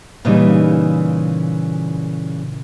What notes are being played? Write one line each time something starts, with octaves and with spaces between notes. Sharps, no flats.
A#2 C#3 E3 G3 D#4